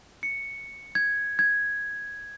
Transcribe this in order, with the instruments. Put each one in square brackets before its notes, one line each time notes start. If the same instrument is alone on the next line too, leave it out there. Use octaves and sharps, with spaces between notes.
[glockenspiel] C#7
G#6
G#6